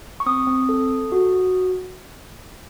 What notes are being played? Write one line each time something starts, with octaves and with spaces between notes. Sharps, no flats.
C#6
C4 D#6
C4
A4
A4
F#4
F#4